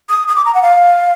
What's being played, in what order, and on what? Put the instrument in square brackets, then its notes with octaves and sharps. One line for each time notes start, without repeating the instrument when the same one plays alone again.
[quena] D#6
D#6
D6
A#5
F#5
F5